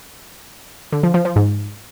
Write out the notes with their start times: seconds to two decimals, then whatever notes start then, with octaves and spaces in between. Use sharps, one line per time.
0.92 D3
1.03 F3
1.14 F3
1.25 F3
1.36 G#2